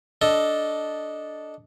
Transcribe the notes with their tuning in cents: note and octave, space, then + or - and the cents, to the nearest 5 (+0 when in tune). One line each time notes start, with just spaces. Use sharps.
D4 -5 A4 +0 D#5 +0